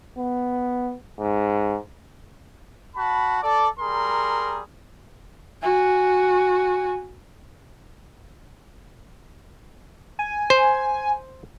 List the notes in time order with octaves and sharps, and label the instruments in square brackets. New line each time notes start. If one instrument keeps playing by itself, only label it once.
[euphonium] B3
G#2
[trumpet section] F#4 A5 B5
A4 D5
G3 G#4 A#4 A#5 C6
[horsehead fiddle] F#4 G#5
[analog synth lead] G#5
[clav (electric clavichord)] C5